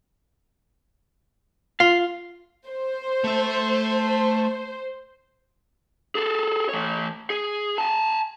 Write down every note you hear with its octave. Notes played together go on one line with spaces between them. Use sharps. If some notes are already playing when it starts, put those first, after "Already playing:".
F4 F5
C5
A3 E5
G#4 A4
E3 C#5
G#4
G#5 A5